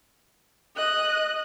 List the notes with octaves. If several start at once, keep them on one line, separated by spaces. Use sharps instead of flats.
D#5 F#6